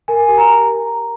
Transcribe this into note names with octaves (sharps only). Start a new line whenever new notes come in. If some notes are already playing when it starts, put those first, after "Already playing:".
A#4 G#5
G4
A#5